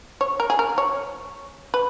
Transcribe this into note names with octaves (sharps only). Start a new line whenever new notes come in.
C#5
A#4
G#4
A#4
C#5
B4